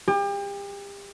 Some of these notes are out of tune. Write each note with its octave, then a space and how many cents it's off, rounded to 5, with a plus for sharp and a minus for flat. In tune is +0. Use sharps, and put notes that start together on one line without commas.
G4 +35